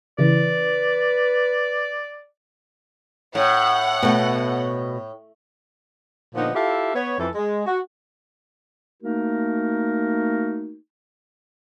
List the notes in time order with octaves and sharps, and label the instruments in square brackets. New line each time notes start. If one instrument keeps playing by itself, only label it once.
[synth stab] C#3 E3 [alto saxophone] B4 [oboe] D5
[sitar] A2 [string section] F#5
[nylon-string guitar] B2 A3
[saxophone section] A#2 D3 F3 B3 D#4
E4 F4 G4 A4 E5 F5
B3 C#5
F2 E3 A4
G#3
F#4
[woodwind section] A3 A#3 D#4 F#4 A#4